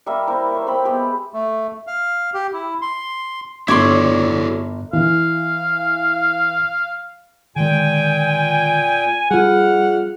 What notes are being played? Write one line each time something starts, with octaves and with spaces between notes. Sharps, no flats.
G3 A#3 A#4 E5
A#3 E4 C5
C5 C#5 E5
C4 C5 G5 B5
G#3 B3 G4
A3
F5
G4
E4
C6
G1 E4 F#4 A4 C#5 D5 C6
E3 F5
A#2 D3 D#3 G#3 G5 G#5
F2 G3 F4 G#4 F#5 F6